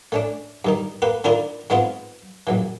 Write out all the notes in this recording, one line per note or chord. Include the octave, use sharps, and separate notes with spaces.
A3 C#4 D4
G2 D#3 D#4
A#3 G4 B4
D#3 D4 E4 F4 A#4 D5
G#2 G#3 B3 C4 F4
A#1 F#2 E3